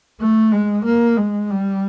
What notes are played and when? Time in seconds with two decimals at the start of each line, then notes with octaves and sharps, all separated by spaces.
0.20 A3
0.52 G#3
0.85 A#3
1.17 G#3
1.50 G3